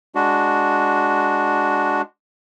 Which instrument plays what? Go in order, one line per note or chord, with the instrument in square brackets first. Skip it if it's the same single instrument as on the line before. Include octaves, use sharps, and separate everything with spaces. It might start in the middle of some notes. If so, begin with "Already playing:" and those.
[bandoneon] G#3 D4 F#4